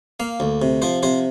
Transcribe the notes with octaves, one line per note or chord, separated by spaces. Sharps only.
A#3 F5
D2
C3
F3 C5
C3 C5